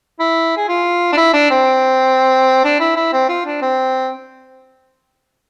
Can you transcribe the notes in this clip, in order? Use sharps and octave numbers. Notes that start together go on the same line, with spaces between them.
E4
G#4
F4
D4
E4
D4
C4
D4
E4
E4
C4
F4
D4
C4